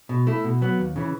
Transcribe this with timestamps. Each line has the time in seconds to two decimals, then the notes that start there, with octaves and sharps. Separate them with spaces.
0.09 B2
0.27 A3 E4
0.44 B2
0.61 F#3 B3
0.79 D#2
0.96 C#3 E3